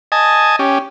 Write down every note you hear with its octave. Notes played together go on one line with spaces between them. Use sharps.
D#5 G#5 A5
C#4 G4